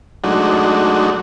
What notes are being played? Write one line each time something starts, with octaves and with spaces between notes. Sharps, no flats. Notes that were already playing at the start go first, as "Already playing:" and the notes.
F#3 G#3 A3 D4 D#4 F#4